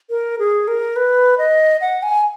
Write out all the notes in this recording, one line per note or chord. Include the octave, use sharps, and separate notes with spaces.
A#4
G#4
A#4
B4
D#5
F#5
G#5